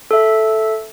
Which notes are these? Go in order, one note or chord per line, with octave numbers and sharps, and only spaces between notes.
A4 E5